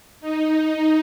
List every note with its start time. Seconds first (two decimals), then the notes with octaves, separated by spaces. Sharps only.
0.21 D#4